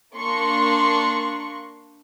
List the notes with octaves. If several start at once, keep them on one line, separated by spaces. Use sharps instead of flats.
A#3 D4 C6 C#6